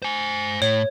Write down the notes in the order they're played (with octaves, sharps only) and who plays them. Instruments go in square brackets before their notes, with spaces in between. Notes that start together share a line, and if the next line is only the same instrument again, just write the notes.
[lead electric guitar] C5 G#5
[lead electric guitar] A2 [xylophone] C#5